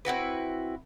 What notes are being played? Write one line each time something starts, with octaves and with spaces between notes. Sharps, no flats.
C4 E4 F#4 B4